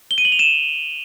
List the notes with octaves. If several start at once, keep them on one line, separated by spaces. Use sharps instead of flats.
G7
D#7
F#7
F7
E7